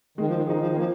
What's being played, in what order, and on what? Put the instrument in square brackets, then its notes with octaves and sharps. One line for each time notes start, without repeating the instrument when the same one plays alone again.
[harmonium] D#3 [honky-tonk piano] G#3
[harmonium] F3
D#3
F3
[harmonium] D#3 [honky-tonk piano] D#4 G#4
[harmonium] F3
D#3
[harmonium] F3 [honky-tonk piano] A#3